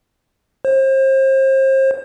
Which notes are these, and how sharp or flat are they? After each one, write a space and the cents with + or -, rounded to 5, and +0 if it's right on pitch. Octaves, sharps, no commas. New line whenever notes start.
C5 +35